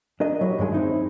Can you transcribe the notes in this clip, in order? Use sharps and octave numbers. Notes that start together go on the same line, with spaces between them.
D4 A#4 D#5
F#3 E4 G4
G2 D#3 G#3 G#5
C4 D#4 E4